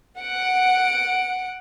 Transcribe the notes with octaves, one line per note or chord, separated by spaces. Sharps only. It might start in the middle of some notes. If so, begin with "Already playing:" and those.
F#5 D7